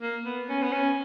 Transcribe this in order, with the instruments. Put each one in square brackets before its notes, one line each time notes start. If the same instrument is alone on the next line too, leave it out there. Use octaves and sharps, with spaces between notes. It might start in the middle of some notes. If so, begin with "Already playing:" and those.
[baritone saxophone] A#3
B3
C#4
B3
C#4